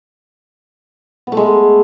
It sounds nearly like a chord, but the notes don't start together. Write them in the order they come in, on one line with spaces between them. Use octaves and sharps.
B3 A3 G#3